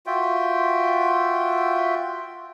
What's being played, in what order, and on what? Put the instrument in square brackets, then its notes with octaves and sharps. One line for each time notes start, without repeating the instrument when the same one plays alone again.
[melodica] F4 F#4 E5 G5